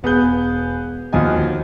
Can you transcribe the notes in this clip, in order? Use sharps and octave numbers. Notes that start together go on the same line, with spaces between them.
E1 B3 G#4 F#6 G6
D#2 F3 D#4 F#4 D#5 G#5